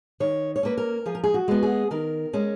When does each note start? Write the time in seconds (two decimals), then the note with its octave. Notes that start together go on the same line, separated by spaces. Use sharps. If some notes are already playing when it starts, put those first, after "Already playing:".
0.20 D#3 C#5
0.56 C#5
0.63 A#3 C#4 B4
0.78 A#4
1.06 F3 G#4
1.15 A#4
1.24 G#4
1.34 F#4
1.48 G#3 B3
1.63 G#4
1.91 D#3 A#4
2.33 G#3 C#4